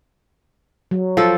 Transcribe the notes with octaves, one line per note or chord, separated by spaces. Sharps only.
F#3
F3 A4